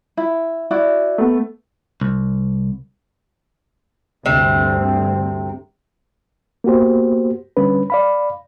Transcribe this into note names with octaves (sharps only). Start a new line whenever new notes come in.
E4
E4 F#4 D5
A3 B3
C2
D2 G2 C3 C4
A#3 B3 F#4 G4 C5
D3 G3 C#4 B4
D5 F5 B5